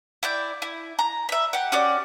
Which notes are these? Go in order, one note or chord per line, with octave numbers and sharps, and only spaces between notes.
E4 D5 G5
E4
A#5
E5 B5
G4 F#5
C#4 F#4 G4 D5